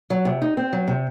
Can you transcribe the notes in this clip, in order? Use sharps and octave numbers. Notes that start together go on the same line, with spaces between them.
F#3
C3
D#4
C4
F#3
C3